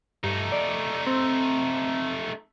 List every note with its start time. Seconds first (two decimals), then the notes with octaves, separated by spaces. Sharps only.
0.24 G2 A3 D#4
0.52 D5
1.07 C4